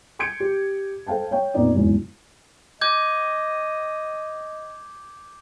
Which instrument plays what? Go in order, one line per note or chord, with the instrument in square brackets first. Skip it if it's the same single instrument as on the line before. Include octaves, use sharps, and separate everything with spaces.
[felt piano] C6 G6 G#6 C#7 D7
G4
A4 C5 F5 G5 A5
C#5 F5 G5
F2 A#2 B3 D#4 D5
F#1 E2 G#2 F#3
[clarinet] D#5 [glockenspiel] D6 G6 G#6